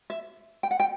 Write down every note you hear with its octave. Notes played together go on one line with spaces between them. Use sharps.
E5
G5
F#5
G5